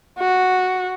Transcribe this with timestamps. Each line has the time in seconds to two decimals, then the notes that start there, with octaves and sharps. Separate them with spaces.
0.20 F#4